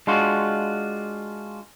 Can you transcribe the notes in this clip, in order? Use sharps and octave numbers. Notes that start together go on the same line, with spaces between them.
G#3 D4 F4 F#4